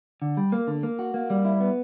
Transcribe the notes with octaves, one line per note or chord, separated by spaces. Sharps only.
D3
G3
A#3
D3
A#3
F#4
A#3
G3
E4
B3